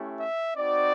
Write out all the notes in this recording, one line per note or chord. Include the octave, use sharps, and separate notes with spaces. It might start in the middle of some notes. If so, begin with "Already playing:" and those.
Already playing: A3 C#4 E4 G4
E5
C4 D#4 F#4 D5